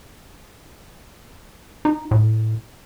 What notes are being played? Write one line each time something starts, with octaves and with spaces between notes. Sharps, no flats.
D#4
A2